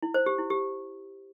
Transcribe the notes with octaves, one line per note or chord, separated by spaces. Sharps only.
E4
C5
G4
E4
G4